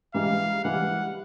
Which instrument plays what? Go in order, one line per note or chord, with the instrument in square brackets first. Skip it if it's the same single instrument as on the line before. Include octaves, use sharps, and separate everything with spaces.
[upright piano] G#2 E3 G3 [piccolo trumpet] F5
[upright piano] G#2 E3 G3 [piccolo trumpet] F#5